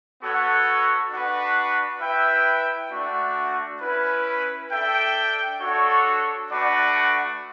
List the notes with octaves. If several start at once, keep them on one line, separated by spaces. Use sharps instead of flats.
B3 F#4 A4 C#5 F#5
D4 F#4 B4
E4 B4 E5 G5
A3 D4 F#4
C#4 E4 B4
D4 A4 E5 G5
D4 F#4 A4 C#5
A3 D4 F#4 B4 D5